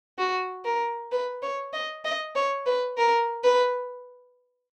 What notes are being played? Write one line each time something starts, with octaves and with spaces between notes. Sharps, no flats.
F#4
A#4
B4
C#5
D#5
D#5
C#5
B4
A#4
B4